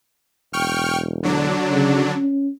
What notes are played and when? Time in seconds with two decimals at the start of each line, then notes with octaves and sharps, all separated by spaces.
0.53 E1 G5 C#6 F6
1.23 D3 F#3 D4
1.71 C#3
2.16 C#4